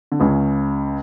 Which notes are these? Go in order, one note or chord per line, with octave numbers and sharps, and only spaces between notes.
D3
C#2 C#3